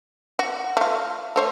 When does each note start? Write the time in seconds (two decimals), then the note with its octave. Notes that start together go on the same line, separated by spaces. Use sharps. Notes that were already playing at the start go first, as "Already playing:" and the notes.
0.39 F#4
0.77 A3 F4
1.36 A3 C5 C#5